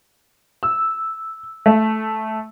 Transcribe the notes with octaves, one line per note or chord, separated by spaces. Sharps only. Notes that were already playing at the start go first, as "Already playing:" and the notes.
E6
A3